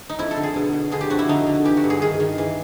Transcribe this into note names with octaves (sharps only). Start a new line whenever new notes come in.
D#4
F2 E4
A4
D3
G#4
B2
B2
D3 G#4
G4
F2 F#4
E4
D3 D#4
D3
E3 G4
F#4
G2
G#4
D#3 G#4
D#3
E3